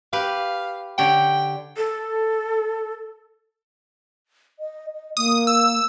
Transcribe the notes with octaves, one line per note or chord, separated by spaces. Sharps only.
G4 B4 F5
D3 G4 C#5 G5
A4
D#5
D#5
A#3 D#6
E6